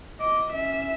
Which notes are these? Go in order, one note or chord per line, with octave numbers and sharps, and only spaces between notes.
D#5 D6
C#4 E5